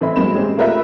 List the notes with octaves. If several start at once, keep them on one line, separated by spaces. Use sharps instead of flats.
A2 E3 C4 E4 D#5 B5
F#3 G#3 A#3 C4 B5 E7
G#3 C4 C#4 G4
A3 A#3 F4 A#4 B4 E5